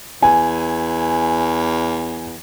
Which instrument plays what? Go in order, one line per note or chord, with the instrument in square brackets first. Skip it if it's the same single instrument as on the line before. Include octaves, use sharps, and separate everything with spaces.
[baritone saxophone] E2 [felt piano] G#5